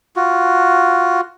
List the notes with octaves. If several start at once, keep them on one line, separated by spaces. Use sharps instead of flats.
F4 F#4